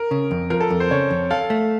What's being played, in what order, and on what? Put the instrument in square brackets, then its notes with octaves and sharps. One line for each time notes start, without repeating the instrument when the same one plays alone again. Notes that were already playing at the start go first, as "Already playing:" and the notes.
Already playing: [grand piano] A#4
[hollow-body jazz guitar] C#3
F2
[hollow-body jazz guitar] F3 [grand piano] A#4
[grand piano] A4
[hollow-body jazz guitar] F2
[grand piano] C5
[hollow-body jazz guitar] C#3 [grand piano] C#5
[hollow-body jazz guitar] F2
[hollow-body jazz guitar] A4 [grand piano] F5
[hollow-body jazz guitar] A3